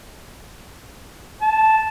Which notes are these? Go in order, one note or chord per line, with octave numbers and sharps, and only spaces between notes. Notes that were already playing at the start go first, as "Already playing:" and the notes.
A5